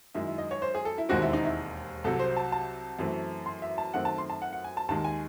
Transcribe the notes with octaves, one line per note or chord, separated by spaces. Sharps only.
F#2 D#3 G#3 E4
E4
D#5
C#5
C5
G#4
A4
E4
E1 D#2 D#3 G#3 C4 F#4
E4
D#4
E4
C2 C3 F#3 A4
C5
A5
A5
F#2 E3 A3 C4
C6
E5
A5
F#2 D#3 A3 C4 F#5
A5
C6
A5
F#5
F#5
G#5
A5
D#2 D#3 G#3 A5
G#5